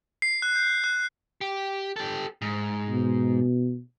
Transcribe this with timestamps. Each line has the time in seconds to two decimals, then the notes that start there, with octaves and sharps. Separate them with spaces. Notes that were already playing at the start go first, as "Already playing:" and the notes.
0.22 C7
0.42 F#6
0.55 G6
0.84 F#6
1.41 G4
1.96 G4 A4
2.42 G#2
2.90 B2